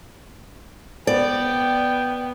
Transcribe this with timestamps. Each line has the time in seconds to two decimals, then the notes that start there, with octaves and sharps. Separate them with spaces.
1.07 B3 D5 G5